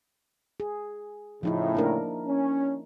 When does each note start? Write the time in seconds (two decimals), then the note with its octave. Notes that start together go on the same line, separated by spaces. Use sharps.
0.60 G#4
1.43 A2 C#3 F3 D#4 E4
1.75 A#3 D4 A#4
2.27 C#4